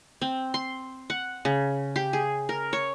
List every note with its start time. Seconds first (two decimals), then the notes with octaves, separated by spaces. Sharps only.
0.21 C4
0.54 C6
1.10 F#5
1.45 C#3
1.96 G4
2.13 G#4
2.49 A#4
2.73 C#5